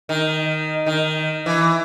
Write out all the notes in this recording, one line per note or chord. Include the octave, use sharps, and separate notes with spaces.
D#3
D#3
E3